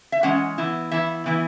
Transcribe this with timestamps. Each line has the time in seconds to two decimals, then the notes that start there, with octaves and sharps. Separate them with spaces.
0.12 E5
0.23 E3 G#3 C#4 F#5
0.58 E3 B3 E4
0.91 E3 B3 E4 E5
1.26 E3 B3 E4